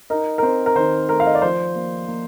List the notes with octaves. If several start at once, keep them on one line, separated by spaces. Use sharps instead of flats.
D#4 A#4
A#4
C4 C5
A#4
D#3 C5
A3 A#4
F5
D#5
D5
F3 C5
A#3
A#3